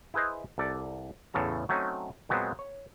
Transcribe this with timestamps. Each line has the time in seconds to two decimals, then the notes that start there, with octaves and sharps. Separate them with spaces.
0.14 E4 G#4 B4 C5 D#5
0.58 C2 A4 D5
1.34 E2 A2 C#3 A4 A#5
1.69 F#3 A3 C4 C#4 D#4
2.29 A#2 F#3 G#3 B3 C4
2.59 C#5